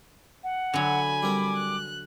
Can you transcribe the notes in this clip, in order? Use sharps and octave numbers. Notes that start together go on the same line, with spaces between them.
F#5
D3 F#3 G#5 B5
G3 C4 A#4 D6
F#6